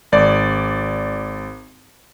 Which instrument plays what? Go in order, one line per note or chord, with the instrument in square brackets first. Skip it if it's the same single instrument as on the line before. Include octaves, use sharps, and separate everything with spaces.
[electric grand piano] G#1 D5